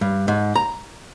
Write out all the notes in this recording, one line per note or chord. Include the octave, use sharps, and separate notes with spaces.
G2
G#2
A#5